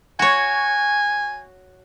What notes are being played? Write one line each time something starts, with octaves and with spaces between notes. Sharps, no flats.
F#4 C#5 G#5